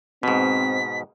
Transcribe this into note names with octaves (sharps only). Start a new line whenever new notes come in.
G#2 B2 C4 B6